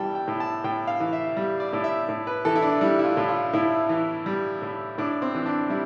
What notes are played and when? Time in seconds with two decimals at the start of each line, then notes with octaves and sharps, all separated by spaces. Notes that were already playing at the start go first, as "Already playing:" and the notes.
Already playing: E3 G3 G5 A5
0.15 G5
0.28 A2
0.40 A5
0.64 A2 G5
0.87 F5
1.00 E3
1.13 E5
1.37 G3
1.60 D5
1.73 A2
1.84 E5
2.09 A2
2.27 B4
2.45 E3 A4
2.56 E4
2.62 D4
2.81 G3 E4
2.99 E4
3.05 F4
3.17 A2
3.29 F4
3.53 A2 E4
3.89 E3
4.26 G3
4.62 A2
4.98 A2 D4
5.22 C4
5.35 E3
5.46 D4
5.70 G3 E4